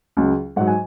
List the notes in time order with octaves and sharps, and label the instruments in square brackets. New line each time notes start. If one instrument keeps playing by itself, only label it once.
[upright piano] C#2 C#3 F#3
G#2 F#3 F#5
G#5